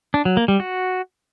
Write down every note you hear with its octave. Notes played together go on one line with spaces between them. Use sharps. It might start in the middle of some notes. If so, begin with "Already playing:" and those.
D4
F#3
A#3
G3
F#4